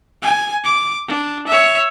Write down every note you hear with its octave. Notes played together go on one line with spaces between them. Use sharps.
G#5
D6
D4
C#5 E5